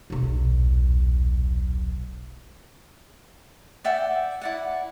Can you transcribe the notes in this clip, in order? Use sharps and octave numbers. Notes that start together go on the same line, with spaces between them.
D#1 B1
D5 E5 F#5 G5
E4 D5 F#5